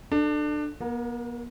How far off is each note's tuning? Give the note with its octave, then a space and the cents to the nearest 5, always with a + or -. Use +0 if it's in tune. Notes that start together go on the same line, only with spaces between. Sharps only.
D4 +25 A4 +0
B3 -45 A#4 +0